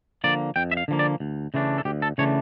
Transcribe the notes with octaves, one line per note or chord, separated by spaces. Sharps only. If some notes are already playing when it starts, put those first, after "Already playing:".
D3 F3 A#3 D5
F2 G5
E5
F5
D3 F3 A#3
D5
D2
C#3 E3 A3 D4
A4
D2 G4
A4
C#3 E3 A3 D4 C#5